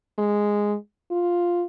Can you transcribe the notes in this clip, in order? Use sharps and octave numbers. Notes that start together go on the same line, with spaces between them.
G#3
F4